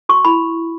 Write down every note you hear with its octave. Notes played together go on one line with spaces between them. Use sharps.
F#4 C#6
E4 B5